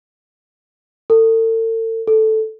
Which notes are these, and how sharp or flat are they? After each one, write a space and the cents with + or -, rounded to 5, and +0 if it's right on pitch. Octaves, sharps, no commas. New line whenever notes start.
A4 +40
A4 -5